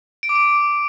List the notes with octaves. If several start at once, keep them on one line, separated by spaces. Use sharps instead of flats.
D7
D6
D7